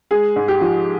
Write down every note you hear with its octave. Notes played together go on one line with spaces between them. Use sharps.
G#3 G#4
G#2
G4
F3